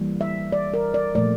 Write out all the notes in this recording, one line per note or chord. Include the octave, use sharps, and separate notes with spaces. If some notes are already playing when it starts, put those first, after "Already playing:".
Already playing: E3 G3 A#3
E5
D5
A#4
D5
A#2 F3 A3 D5